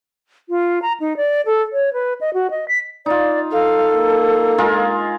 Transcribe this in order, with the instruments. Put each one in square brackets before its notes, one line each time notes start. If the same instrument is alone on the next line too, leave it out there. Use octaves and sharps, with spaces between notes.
[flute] F4
A#5
D#4
D5
A4
C#5
B4
D#5
F#4
D#5
B6
[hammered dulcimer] D#4 F4 [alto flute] D5
[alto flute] A4 [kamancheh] F5
[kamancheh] A#3
[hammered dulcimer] G#3 F4 A#4